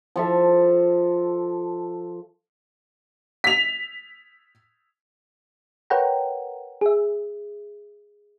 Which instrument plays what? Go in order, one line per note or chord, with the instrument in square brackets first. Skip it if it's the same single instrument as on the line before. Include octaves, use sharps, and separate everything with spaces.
[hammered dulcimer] F3 A4 E5
[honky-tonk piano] B6 F7
[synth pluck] A#4 B4 C#5 F#5 G5 A#5
G#4 E5